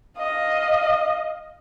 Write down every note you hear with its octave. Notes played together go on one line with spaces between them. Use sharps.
D#5 F5